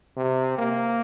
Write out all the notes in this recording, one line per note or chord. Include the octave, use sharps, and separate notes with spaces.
C3
A#3